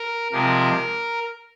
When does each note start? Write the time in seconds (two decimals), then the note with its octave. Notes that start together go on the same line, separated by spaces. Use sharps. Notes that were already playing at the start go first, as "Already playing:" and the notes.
Already playing: A#4
0.32 C3 F3 G#3 A#4